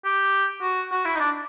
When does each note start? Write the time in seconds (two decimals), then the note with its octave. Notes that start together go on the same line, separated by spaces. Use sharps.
0.05 G4
0.62 F#4
0.92 F#4
1.05 E4
1.15 D#4
1.20 D4